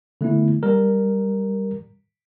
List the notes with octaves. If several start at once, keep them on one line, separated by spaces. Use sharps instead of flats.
D3 A3 B3 E4
G3 A#4